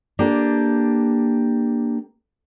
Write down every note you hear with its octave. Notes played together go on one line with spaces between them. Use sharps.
A#3 D4 G4 A4